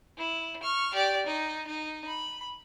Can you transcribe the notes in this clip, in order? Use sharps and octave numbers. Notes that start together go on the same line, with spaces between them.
E4
C#6 F6
G4 D5
D#4
D#4
B5